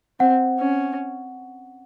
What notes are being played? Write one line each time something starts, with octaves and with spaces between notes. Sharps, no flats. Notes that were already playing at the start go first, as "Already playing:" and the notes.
C4 F#5
C#4